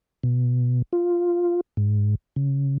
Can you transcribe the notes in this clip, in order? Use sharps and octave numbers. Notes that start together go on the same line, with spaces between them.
B2
F4
G#2
C#3